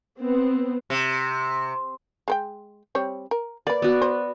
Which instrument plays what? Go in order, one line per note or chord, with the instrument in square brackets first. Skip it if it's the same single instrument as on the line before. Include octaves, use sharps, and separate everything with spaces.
[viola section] B3 C4
[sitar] C3
[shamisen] G#3 A#4 G5
G3 C4 C#5
A#4
[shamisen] A#3 B4 [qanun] D5
[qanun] B3 F#4
[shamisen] C5